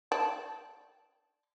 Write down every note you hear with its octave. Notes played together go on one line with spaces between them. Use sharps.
D5 G5 A5